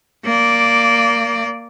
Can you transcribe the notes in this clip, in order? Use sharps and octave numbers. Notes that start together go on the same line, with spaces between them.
A#3 D5